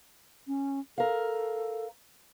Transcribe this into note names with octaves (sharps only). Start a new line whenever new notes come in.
C#4
A4 A#4 F5